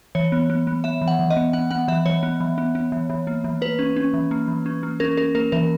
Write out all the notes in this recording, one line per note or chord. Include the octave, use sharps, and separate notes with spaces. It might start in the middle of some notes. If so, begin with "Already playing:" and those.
E3 C#5
B3
B3
B3
B3 E5
E3
F#5
E3
D#5
B3
B3 F#5
B3 F#5
E3 E5
E3 C#5
B3
E3
B3
B3
E3
E3
A#3
E3
A#3 B4
C#4
C#4
E3
A#3
E3
C#4
A#3
C#4 A#4
C#4 A#4
A#3 A#4
E3 A#4